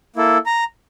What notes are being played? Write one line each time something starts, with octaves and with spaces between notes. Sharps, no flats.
A#3 E4 A4
A#5